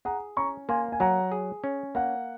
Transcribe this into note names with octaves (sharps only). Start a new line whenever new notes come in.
G#4 F#5 A#5
C#4 A#5 C#6
A#3 G#5 C6
G#5
F#3 F#5 A#5
G#4
C#4
A#3 F#5